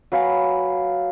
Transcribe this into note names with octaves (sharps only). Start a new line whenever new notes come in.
F#3 B4 F5 G#5